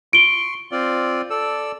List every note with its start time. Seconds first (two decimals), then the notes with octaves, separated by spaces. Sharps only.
0.13 C6 C#6 D7 G7
0.72 C4 F4 D5
1.30 A4 D5 E6